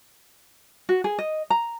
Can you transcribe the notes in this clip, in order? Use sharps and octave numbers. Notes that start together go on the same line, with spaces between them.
F#4
G#4
D#5
A#5